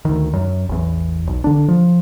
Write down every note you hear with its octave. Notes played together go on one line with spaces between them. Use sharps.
D2 D#3
F#2
A1 E2
B1
D3 D4
F3